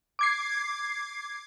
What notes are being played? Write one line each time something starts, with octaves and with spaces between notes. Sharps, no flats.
D6 G#6 C7